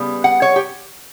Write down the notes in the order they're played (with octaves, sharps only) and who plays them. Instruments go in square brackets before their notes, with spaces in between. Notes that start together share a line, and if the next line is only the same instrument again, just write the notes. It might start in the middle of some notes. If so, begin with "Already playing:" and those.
Already playing: [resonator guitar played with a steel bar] C#3 G3 B3
F#5
C#5
G4